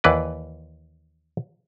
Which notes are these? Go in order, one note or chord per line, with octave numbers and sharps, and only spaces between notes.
D#2 E3 B4 D5